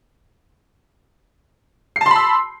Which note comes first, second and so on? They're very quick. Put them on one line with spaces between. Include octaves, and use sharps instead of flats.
C7 A5 C6 B5 E6